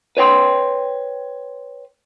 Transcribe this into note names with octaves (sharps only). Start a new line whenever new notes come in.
B4 C#5 G5 C6